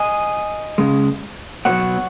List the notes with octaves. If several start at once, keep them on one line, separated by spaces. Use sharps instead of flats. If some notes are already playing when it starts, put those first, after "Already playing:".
Already playing: D#5 G#5
C#3 G#3
B2 F#3 C#5 F#5